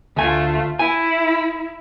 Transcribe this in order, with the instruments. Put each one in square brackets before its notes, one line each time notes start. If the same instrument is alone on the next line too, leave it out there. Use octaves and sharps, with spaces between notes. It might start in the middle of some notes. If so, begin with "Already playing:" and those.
[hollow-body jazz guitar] D2 G#5 [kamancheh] A3 F4
[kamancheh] E4 [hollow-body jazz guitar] G#5